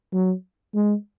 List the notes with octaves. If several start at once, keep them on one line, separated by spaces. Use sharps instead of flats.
F#3
G#3